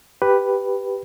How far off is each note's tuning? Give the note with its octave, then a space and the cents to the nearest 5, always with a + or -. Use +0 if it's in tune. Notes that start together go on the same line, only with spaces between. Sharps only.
G4 +0 B4 +0